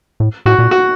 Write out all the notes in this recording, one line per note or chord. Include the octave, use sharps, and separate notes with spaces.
A2
A2 F#4
A#2
F#4